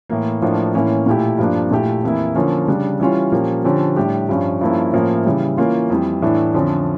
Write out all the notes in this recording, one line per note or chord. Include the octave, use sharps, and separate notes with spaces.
A2 E3 A#3
A2 F3 A#3 D4 F4
A2 E3 A#3 C#4
A#2 A3 E4 G4
G2 F3 A#3 D4
A#2 A3 E4 G4
F2 E3 A#3 E4
D3 F3 A#3 C#4
C#3 G3 D4
E3 G3 C#4 F4
A#2 F3 A#3 C#4 G4
D3 F3 C#4 G4
A2 G3 D4 G4
G2 F3 C#4
G2 F3 A#3 C#4 E4
A2 F3 A#3 C#4 E4
C#3 E3 G3
E3 A#3 C#4 F4
F2 E3 G3
A2 E3 A3 D4
F2 D3 F3 C#4